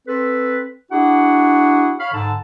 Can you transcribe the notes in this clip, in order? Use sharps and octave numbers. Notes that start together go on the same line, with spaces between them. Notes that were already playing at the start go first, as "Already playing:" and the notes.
C4 A4 B4
D4 E4 F#4 G#4 F#5
C#5 F5 B5
G#2 D3 A5